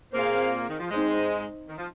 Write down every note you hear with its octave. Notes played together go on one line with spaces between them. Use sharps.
A#2 A#3 C4 G#4 C5 F5
D#3
F3
G#2 G#3 C4 D#4 C5 D#5
D#3
F3